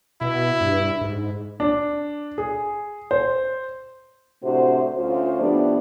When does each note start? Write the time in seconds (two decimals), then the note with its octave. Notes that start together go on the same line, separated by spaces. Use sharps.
0.21 B2 E4
0.61 G2
1.01 G#2
1.60 D4
2.38 G#4
3.11 C5
4.43 A2 C3 D4 F#4 C5
4.96 D2 C#4 F4 C5
5.39 A2 F3 B3 D4 G4 D5